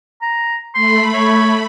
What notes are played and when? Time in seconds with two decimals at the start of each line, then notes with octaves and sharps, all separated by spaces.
0.22 A#5
0.75 A3 B5 C6
1.14 C#5